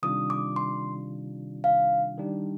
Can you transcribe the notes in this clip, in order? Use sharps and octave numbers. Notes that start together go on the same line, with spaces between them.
C3 D#3 G3 D4 F4 D#6
D6
C6
F5
D#3 G3 D4